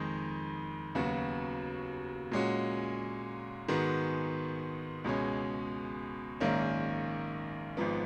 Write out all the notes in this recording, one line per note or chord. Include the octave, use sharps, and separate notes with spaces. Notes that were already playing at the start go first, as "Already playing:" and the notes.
Already playing: F2 D#3 G#3 D#4
D#2 C#3 F#3 B3 F#4
A#2 G#3 C#4 F#4
G#2 D#3 G#3 B3 F#4
C#2 B2 G#3 C#4
A#1 G#2 D#3 A#3 C#4
G#1 G#2 F3 B3